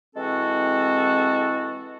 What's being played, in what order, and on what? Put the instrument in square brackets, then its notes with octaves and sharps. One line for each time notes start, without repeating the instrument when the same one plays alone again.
[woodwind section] E3 G#3 C4 E4 F#4 A4